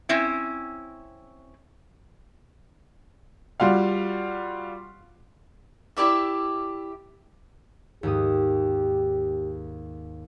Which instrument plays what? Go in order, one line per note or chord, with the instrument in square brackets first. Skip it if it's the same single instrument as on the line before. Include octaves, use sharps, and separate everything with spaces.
[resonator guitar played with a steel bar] C4 C#4 E4
[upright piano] G3 F4 F#4 F5
[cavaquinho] E4 G4 D5 E5
[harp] D#2 G#2 D#6 [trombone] G4